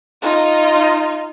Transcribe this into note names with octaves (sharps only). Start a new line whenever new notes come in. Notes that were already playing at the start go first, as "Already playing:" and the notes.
D#4 F4